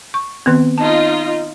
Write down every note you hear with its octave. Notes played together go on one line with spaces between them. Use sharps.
C#6
D#3 B3 C4
D#4 F4 A5